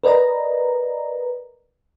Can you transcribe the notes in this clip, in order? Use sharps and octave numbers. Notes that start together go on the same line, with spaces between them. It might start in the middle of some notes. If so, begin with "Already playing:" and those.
A#4 B4 D5 D#5 A#5